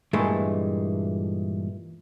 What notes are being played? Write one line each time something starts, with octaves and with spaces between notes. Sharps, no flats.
G2 A#2 E3 G#3 A3